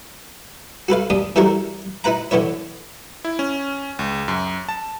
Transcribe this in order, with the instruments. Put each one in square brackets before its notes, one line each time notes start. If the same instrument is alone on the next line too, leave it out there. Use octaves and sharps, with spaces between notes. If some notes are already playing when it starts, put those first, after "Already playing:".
[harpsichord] F#4 A4 B4 F5
D#2 D4 D#6
E3 G3 E4 F#4 A4 A#4
D#4 E4 B4 F#5 A#5
D3 E3 B3 E4 C#5
[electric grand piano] E4
C#4
C#2
F#2
A5